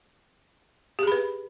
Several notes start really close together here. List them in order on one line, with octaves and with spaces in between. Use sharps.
G4 G#4 B5 B4